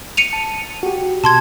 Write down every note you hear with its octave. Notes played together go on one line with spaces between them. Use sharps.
C#7 D#7 F7
A5
F#4 G4
B2 A5 C6 G#6